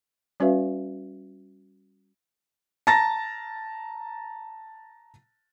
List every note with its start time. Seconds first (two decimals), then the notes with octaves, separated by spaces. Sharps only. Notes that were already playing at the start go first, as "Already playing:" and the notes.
0.40 G3 C#4 F#4 B4 E5 F5
2.87 A5 A#5 A6 A#6